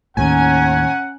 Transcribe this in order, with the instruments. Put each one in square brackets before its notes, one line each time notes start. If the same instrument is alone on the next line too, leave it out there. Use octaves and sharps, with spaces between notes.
[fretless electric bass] D#2 A2 [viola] C#4 A#5 [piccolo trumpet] F#5 [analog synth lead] G#5